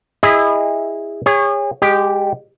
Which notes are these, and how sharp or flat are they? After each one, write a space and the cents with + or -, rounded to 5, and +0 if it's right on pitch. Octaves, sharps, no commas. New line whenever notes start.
E4 +0 G#4 -30 D#5 +0
G#4 -40 C#5 +0
G#3 -25 G4 +0